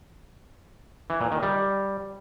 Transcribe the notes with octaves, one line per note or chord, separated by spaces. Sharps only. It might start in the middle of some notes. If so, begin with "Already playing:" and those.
E3
A#2
D#3
G3